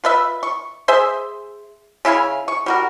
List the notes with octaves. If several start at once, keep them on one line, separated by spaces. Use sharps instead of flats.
F4 B4 E5
C#6
G#4 C5 E5
C#3 E4 F5 G#5
C#6
G3 F#4 A#4